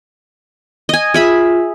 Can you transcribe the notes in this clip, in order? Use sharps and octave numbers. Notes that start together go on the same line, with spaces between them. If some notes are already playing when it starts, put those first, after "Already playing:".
D#5 G#5
F4 G#4 E5 B5